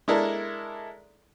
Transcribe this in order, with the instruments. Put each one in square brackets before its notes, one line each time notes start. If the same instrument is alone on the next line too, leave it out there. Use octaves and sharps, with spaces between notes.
[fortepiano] G#3 D4 E4 A4 A#4